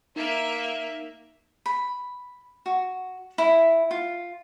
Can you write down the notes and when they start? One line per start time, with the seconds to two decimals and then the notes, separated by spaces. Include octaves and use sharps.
0.16 A#3 D#4 E5
1.66 B5
2.66 F#4
3.38 E4
3.91 F4